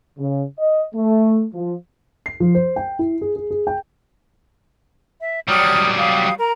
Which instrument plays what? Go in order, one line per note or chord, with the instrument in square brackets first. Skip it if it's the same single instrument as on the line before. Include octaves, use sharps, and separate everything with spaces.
[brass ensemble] C#3
D#5
A3
F3
[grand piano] C7
F3
C5
G5
E4
G#4
G#4
G#4
G5
[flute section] E5
[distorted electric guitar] F#3 G3 [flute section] D#6 F6
[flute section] F5 D#6
A#4 A#5